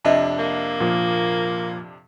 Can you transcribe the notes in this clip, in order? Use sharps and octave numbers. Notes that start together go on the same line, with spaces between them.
F2 C3 D4 D#5 E5 A5
A#3
A#2 F3